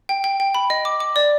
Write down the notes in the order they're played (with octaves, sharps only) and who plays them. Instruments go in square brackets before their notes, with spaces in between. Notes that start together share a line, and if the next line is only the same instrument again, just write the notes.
[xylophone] G5
G5
G5
B5
D#5
D6
D6
D5